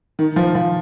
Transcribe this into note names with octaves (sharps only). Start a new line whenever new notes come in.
D#3
F3
F3